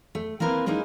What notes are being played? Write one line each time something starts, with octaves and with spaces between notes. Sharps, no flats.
A3
A#3 C4 E4 A#4 B4
G#3 A#3 C#4 D#4 E4